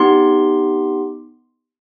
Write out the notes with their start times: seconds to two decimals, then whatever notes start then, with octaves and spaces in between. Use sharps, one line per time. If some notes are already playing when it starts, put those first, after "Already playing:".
Already playing: B3 D#4 G4 C6